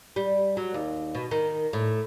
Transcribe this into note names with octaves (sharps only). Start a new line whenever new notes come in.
G3
F#3
D#2
B2
D#3
A2